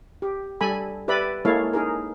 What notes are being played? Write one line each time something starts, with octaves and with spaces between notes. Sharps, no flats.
G4
G3 A4 G#5 B5
G4 B4 D5 E5 B5
G#3 A#3 E4 A4 C#5 F5
D#4 G#4 A#4